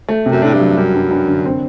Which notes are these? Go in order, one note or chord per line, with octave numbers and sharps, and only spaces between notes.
A3
C3
F#2
A2 D4
G2
F#3
F#2 G3
G2
G2
D3
C4